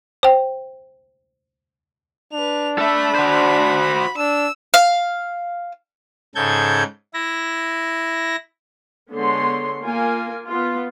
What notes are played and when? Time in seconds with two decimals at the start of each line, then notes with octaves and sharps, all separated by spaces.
0.23 C5 G5
2.33 D4 B4 F7
2.78 A4 E5 B5
3.15 F#4 C5
4.18 D4 E6
4.74 F5
6.35 G#2 C#3 A4 G6 G#6
7.14 E4 A#6
9.12 D3 G#3 B3 C#5 C6
9.82 A#3 F4 A#4 G#5
10.47 B3 F4